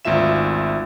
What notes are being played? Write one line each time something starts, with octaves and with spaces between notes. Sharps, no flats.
G#1 D2 F4 E5 E7